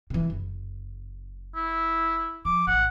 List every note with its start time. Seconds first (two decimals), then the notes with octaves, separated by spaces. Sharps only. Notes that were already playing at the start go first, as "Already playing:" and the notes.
0.10 C3 E3
0.30 F#1
1.55 E4
2.45 F3 D6
2.67 A1 F#5